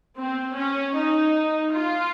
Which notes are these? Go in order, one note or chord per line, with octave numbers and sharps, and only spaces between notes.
C4
C#4
D#4
F4